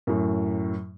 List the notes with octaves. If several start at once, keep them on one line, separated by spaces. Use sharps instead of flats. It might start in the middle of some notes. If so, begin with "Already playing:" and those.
F#2 A2